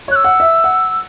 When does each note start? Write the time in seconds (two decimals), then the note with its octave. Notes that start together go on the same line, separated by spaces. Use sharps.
0.08 C#5 F#6
0.16 E6
0.24 F#5
0.40 E5
0.64 F#5